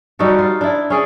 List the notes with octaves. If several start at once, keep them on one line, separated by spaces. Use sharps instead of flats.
G3 D#4 F#4 A4
F4
D4 E4
C#4 G#4 D5